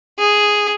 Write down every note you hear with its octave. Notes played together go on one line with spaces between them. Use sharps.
G#4